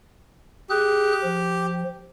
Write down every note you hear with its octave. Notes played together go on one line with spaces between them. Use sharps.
G4 G#4 F#6
F3